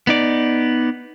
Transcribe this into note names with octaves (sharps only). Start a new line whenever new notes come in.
B3 D#4 D5